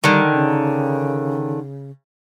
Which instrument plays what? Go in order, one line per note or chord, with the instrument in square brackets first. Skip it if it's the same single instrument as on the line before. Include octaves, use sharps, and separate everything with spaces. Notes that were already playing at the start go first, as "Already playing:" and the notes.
[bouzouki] D3 D#3 [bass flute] G3
[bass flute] C#3